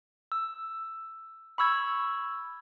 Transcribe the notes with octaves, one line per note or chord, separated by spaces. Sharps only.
E6
B5 C#6 E6 G#6